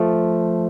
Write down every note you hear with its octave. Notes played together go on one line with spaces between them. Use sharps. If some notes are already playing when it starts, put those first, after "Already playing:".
Already playing: F3 A3